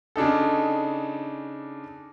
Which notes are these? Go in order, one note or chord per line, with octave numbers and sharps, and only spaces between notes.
C#3 D4 D#4 A4